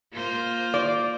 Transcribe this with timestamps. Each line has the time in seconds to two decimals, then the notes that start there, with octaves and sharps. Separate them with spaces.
0.14 A#3 F4 C5
0.74 D5